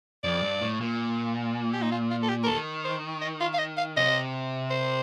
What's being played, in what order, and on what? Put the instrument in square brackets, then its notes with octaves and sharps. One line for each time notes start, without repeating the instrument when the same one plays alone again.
[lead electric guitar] F2 [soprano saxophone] D5
[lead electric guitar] G2
A2
A#2
[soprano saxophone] G4
D#4
F4
F4
A4
G4
A#4
[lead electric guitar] D#3 [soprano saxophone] A4
[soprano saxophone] C5
D#5
F4
F5
D#5
F5
[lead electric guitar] C3 [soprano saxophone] D#5
[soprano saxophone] C5